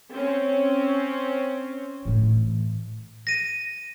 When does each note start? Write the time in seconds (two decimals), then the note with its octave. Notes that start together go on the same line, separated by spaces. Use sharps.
0.12 C4 C#4
2.05 A2 E3
3.27 A#6 D#7